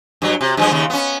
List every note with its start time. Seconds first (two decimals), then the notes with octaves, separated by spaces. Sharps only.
0.22 G2 F#3
0.41 C3
0.57 G2 F3 G#3
0.71 D#2 C#3
0.90 B3 C#4